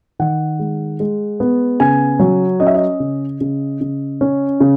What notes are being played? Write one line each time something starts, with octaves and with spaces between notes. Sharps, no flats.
D#3 F#5
G#3
G#3
B3
C#3 G#5
F#3
C#4 D#5
E5
D#5
C#3
C#3
C#3
C#4
C#3